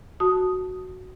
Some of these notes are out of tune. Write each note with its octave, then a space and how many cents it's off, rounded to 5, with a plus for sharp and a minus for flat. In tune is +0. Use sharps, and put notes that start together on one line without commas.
F#4 +0 A5 +0 D#6 +0